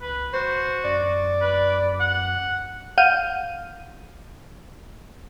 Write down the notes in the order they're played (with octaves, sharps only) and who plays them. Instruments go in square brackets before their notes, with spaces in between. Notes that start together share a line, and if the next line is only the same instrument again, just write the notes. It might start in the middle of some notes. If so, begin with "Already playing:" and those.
[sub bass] C#2 [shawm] B4
[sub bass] D1 [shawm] F#4 [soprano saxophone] C5
[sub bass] F#2 [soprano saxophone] D5
[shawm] B4
F#5
[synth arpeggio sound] F5 F#5 F6 G6 D#7